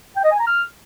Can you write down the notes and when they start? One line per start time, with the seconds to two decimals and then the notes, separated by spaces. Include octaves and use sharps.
0.16 G5
0.24 D#5
0.32 G#5
0.39 A#5
0.47 F6